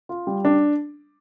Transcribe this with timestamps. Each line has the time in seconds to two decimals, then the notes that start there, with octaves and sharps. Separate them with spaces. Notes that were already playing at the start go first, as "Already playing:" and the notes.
0.09 F4
0.27 G3
0.45 D4